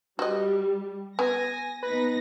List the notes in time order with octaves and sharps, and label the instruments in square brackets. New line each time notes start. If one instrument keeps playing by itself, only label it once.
[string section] G3 [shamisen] F#4 D#5
[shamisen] B3 [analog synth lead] G#5 [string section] A#6
[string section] B3 D#4 A#6 [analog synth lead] B4